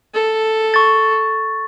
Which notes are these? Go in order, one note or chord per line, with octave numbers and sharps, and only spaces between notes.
A4
C#6 A6